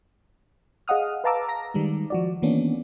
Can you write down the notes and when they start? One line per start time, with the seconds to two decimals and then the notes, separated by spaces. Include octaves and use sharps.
0.88 G#4 D#5 F5 F#5 D#6 F6
1.24 B4 F5 A5 A#5 D6 E6
1.48 A#5 A#6
1.74 D#3 G3 G#3
2.10 F3 F#4 D5
2.42 D#3 E3 A#3 B3 C#4 D4